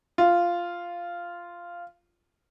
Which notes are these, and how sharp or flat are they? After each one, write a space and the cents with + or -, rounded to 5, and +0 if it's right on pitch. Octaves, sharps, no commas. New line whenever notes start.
F4 -5